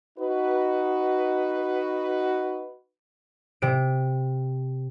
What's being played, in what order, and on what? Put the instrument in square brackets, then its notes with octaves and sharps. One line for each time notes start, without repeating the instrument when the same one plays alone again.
[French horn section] D#4 F#4 B4
[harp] C3 D7